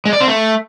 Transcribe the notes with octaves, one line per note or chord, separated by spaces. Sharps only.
G#3
D5
C4
A3